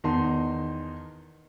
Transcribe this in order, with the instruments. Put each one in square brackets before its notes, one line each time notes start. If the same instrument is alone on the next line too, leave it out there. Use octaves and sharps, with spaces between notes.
[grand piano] E2 D#3 D#4 A5 C6